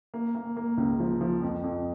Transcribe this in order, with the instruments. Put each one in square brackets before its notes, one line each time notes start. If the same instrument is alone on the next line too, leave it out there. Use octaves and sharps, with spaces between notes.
[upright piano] A#3
A#3
A#3
C#2
F3
F3
F2
F2